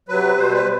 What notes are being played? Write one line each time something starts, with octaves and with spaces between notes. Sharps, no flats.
C3 F#3 B4
B2 G3 C5
B4